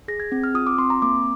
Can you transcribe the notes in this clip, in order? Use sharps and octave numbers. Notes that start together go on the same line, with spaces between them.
G#4 A#6
G#6
C4
F6
F4 D#6
D6
C4 C6
A#5
A#3 D6